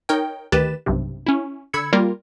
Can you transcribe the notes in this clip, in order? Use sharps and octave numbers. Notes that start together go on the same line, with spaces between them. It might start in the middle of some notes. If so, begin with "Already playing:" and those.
D#4 A#4 C#5 G5
D2 D#3 G4 B4 A6 E7
B1 G2 C3
C#4 E4
D3 B5 E6 G#6 C#7
G3 A#3 F4 A#4